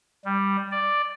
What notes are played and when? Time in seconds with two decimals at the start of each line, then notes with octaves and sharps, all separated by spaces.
0.25 G3
0.72 D5